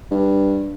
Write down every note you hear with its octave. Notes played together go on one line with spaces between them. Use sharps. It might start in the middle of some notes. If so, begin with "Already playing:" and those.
G2